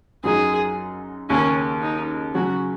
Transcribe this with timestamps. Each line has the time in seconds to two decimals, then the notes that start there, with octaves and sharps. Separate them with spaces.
0.24 F#2 F#3 D#4 G#4
1.30 D#2 C#3 A#3 C#4
1.83 D#4
2.34 C#3 F#3 C#4 F#4